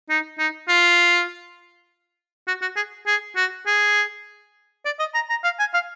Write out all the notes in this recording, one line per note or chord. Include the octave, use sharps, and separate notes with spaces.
D#4
D#4
F4
F#4
F#4
G#4
G#4
F#4
G#4
D5
D#5
A#5
A#5
F5
G#5
F5